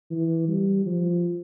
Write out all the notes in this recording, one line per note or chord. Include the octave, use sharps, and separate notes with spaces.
E3
G3
F3